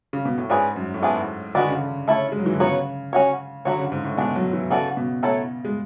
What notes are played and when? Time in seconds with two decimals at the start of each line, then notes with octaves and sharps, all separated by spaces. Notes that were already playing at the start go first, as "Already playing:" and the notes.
0.13 C#3
0.25 B2
0.38 A2
0.49 G#2 C#4 G#4 B4 D5
0.76 F#2
0.94 A2
1.02 G#2 E3 B3 D4 G#4
1.55 D3 G#3 B3 F#4 B4 D5
1.69 C#3
1.83 D3
2.08 A3 E4 A4 C#5
2.32 G#3
2.39 F#3
2.46 E3
2.53 D3
2.60 C#3 F#3 B3 F#4 C#5
3.13 C#4 F#4 C#5
3.65 D3 F#3 C#4 F#4 C#5
3.78 C#3
3.92 G#2
4.04 A2
4.17 B2 G#3 D4 F#4
4.35 F#3
4.53 E3
4.70 C#3 E3 B3 F#4 A4 D5
4.97 B2
5.23 F#3 A3 E4 A4 C#5
5.65 G#3